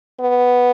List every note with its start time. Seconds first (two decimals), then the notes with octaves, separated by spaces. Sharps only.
0.20 B3